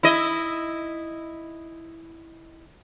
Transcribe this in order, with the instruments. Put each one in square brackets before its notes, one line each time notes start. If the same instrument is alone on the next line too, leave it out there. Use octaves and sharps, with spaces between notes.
[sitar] E4 D#5